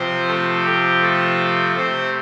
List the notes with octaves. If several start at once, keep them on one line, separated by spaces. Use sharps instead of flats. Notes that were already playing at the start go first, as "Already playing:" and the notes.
Already playing: C3 F3 C4 C5
A3 A4
G4
A3 A4
C3 A3 C4 C5